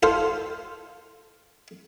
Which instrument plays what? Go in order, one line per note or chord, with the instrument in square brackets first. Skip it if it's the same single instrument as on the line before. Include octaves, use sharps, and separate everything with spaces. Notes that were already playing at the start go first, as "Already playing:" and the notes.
[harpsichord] F4 A4 C5